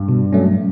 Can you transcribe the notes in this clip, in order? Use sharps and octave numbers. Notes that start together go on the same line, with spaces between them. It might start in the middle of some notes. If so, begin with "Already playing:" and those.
Already playing: G2
B2
F#3 A3 C#4